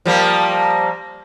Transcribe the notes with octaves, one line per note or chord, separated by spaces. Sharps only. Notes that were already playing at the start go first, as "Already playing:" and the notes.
F3 G3 A#3